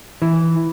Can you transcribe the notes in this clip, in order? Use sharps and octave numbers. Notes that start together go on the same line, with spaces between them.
E3